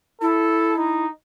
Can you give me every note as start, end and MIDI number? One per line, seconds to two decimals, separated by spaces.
0.22 1.06 64
0.22 0.75 69
0.77 1.09 63